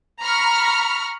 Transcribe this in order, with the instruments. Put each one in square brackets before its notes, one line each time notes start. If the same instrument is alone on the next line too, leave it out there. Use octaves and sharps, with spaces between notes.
[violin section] A#5 B5 C#6 F6